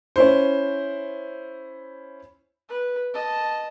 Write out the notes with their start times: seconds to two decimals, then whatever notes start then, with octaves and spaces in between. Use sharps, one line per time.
0.16 C#4 E4 C5
2.69 B4
3.14 D#5 A5